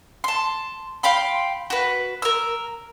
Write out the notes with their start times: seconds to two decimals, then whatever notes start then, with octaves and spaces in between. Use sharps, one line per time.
0.24 A5 C6
1.03 F5 G5 B5 C6
1.70 F#4 B4
2.22 A#4 E6